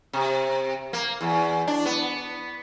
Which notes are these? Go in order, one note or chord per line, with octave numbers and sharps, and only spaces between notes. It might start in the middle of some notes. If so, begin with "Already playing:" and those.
C3
A#3
E2
D4
B3